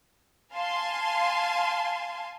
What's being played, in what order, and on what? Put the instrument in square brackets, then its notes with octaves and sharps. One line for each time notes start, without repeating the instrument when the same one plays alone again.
[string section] F5 G#5 A5 C6